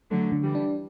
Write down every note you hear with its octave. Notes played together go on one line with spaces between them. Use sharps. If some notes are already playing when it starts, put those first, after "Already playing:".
D3 F#3 A3
D3
E3 G3
D4